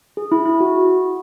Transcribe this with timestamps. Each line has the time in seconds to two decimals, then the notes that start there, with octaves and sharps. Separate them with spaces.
0.17 G#4
0.32 E4
0.46 E4
0.60 F#4